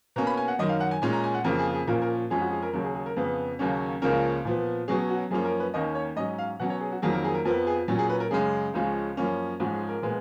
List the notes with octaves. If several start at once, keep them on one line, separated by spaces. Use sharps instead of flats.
B2 A#3 C#4 A#5
B5
G#5
F#5
F#2 D#3 F#3 D#5
F5
F#5
G#5
A#2 G#3 C#4 G#5
A#5
G#5
F#5
F2 C#3 F3 A#3 A#4
G#4
G#4
A#2 F3 A#3 C#4 A#4
A#4
F2 F3 G#3 C#4 G#4
F#4
G#4
A#4
D#2 C#3 F#3 A#4
G#4
G#4
A#4
F2 C#3 F3 B3 G#4
D#2 C#3 F#3 A#3 C#4
C#2 C#3 F3 A#3 C#4 A#4
A#2 F3 B3
B2 F#3 C#4 G#4
F#4
F#2 F3 A#3 C#4 G#4
A#4
B4
D#2 D#3 A#3 C#4 D#5
C#5
G#2 F#3 C#4 D#5
F5
B2 F#3 C#4 F#5
C#5
G#4
F#4
F2 D#3 F#3 A#3 G#4
A#4
G#4
A#4
F2 F3 B3 A#4
G#4
A#2 F#3 C#4
G#4
B4
A#4
F#2 C#3 G#3 G#4
C#2 C#3 F3 G#3 C#4
F#2 F3 A#3 C#4
G#2 F3 G#3 C#4 F#4
G#4
A#4
A#2 F3 G#3 B3